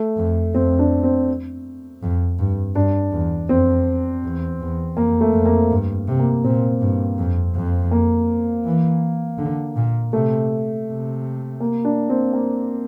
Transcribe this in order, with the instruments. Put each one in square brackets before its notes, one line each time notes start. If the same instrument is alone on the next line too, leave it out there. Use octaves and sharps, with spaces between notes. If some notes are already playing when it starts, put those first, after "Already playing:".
Already playing: [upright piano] A3
[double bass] F2
[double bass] F2 [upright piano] C4
[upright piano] D4
C4
[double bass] F2
G2
[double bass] G2 [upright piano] D4
[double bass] E2
[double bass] F2 [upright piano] C4
[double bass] E2
E2
[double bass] F2 [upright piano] A#3
[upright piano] A3
[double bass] F2
[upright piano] A#3
[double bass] G2
C3
[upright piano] A#3
[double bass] A#2 [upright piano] C4
[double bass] G2
F2
F2
[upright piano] A#3
[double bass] E3
D3
A#2
[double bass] C3 [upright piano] A3
[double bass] C3
[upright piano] A#3
D4
C4
A#3